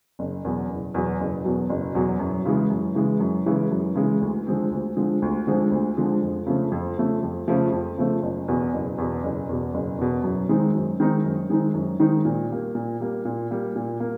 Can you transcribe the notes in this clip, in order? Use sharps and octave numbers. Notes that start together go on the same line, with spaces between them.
F#1
E2 B2 F#3
F#1
E2 B2 F#3
F#1
E2 B2 F#3
F#1
E2 B2 F#3
F#2
C#3 E3 G#3
F#2
C#3 E3 G#3
F#2
C#3 E3 G#3
F#2
C#3 E3 G#3
D2
D3 F3 G#3 C4
D2
D3 F3 G#3 C4
D2
D3 F3 G#3 C4
D2
D3 F3 G#3 C4
F2
C#3 F3 A3
F2
C#3 F3 A3
F2
C#3 F3 A3
F2
C#3 F3 A3
F#1
E2 B2
F#1
E2 B2
F#1
E2 B2
F#1
E2 B2
F#2
D#3 G#3 C4 D#4
F#2
D#3 G#3 C4 D#4
F#2
D#3 G#3 C4 D#4
F#2
D#3 G#3 C4 D#4
A#2
G3 A#3
A#2
G3 A#3
A#2
G3 A#3
A#2
A#3